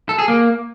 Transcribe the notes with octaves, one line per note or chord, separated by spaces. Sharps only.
A4
G#4
A#3